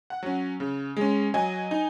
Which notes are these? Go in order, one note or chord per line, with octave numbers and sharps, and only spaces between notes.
F#5
F#3 C#4
C#3
G#3 C#4
F#3 D#5 G#5
D#4